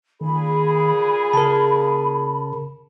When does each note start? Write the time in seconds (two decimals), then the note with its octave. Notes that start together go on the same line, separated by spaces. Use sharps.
0.21 A#2 D#3 G#4 B5
1.33 C#3 A#4 A5